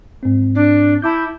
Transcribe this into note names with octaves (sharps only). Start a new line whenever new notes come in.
G#2 C4
D4
E4 A5 D6 G6